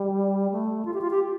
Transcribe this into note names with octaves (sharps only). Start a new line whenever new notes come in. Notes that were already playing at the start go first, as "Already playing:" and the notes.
Already playing: G3
A3
F4
G4
F4
G4